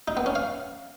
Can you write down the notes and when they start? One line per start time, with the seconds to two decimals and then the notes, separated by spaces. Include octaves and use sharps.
0.08 D#4
0.17 B3
0.26 C#4
0.35 F5